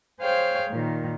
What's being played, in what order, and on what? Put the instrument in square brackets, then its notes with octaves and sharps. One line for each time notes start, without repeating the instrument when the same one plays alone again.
[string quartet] G#4 C5 C#5 F5 G5
A#2 D#3